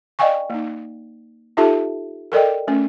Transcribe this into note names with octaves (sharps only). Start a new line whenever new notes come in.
D5 D#5 F5 G5 G#5 C#6
A#3 D#4
D#4 F4 G4 A4 E5 A5
A4 A#4 D5 D#5 G5
A3 C#4